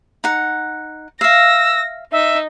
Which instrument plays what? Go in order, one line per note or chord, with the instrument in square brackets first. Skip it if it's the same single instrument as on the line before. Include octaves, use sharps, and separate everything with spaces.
[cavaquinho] D#4 F#5
[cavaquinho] E5 F5 [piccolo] E6 [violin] A#6
[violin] D#4 [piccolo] E5